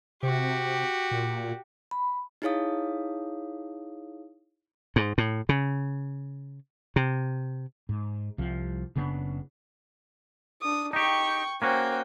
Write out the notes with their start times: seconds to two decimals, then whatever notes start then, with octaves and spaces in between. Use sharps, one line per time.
0.23 C3 F#4 G4
1.11 A#2
1.91 B5
2.42 D#4 E4 G#4 C#5 F5 D#6
4.96 G#2
5.18 A2
5.49 C#3
6.96 C3
7.89 G#2
8.38 C2 F3
8.96 F#1 C#3 B3 D4
10.62 D4 D#6
10.93 D#4 G4 G5 C#6
11.62 A#3 C#4 F#4 C5 G5